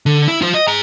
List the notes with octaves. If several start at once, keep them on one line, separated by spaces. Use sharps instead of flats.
D3
E4
F4 C5
D#5
G#4 A#5